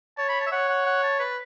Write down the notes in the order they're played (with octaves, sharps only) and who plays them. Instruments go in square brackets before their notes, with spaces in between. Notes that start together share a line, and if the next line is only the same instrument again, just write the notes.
[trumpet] C#5 [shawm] A5
[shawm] B5
A5
E5
[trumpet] C#5 [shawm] F#5
[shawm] F#5
F#5
A5
B4